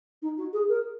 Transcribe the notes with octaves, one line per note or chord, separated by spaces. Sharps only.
D#4
F#4
G#4
A#4